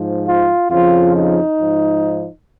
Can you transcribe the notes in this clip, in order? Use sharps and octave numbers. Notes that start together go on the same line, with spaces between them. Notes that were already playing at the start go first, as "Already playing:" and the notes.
Already playing: G#2 F3
F4
F2 C#3 F3 F4
D#4
G#2 F3